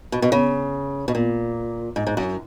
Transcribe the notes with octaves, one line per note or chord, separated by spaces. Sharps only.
B2
B2
C#3
B2
A#2
G#2
G#2
F#2